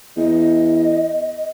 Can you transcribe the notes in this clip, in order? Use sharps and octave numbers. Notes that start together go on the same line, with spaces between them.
E2 D#5